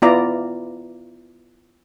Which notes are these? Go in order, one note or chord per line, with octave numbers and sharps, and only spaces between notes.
B3 E4 F4 D5 A#5